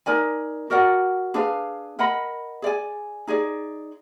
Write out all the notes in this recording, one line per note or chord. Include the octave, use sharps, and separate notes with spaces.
D#4 A#4 D5 G#5
F#4 A#4 D5 F#5
D4 G#4 B4 F5
A#4 D#5 F#5 B5
G#4 D5 G#5
D#4 G#4 D5